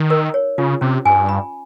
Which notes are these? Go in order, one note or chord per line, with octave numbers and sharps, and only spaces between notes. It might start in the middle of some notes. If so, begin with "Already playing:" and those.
Already playing: D#3 D#4
A#4
C#5
C#3 F4
C3 C#4
G2 G#5
B5